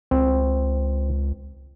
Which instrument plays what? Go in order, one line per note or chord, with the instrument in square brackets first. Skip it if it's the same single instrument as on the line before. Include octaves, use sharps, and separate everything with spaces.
[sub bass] C#2 [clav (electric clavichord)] C4